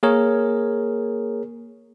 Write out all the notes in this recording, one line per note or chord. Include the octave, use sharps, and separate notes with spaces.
A#3 G#4 A#4 C#5